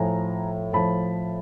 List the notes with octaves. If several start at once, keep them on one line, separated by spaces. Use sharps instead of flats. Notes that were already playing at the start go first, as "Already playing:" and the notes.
Already playing: A2 F3 G#5 A#5
A2 F3 A5 B5